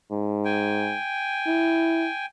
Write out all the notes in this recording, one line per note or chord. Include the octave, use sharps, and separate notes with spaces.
G#2
G5 G#5
E4